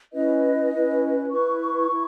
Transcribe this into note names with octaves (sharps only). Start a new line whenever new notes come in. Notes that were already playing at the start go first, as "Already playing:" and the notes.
C#4 E4 B4 D#5
C#4 E4 B4
E4 B4 C#6
E4